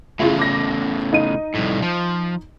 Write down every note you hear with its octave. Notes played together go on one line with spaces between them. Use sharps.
A2 C#3 E4 F4 G#4
D6 A#6
D#4 D#7
C2 A2
F3